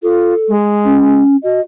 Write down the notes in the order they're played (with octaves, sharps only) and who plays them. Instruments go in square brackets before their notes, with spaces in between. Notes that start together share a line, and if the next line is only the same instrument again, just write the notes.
[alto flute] F4 [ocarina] A4
[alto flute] G#3
[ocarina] C#4
[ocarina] F#4 [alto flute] D#5